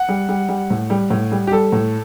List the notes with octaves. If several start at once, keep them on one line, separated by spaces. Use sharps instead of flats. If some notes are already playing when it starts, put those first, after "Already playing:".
Already playing: F#5
G3
G3
G3
A2
G3
A2
G3
G4
G3 A4
A2